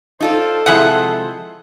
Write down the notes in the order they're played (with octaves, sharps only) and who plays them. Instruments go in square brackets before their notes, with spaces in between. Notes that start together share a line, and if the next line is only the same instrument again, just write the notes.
[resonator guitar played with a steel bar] D#4 F4 D5 [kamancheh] A4 C5
[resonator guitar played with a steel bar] C3 F3 G#3 [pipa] E4 G#4 F#5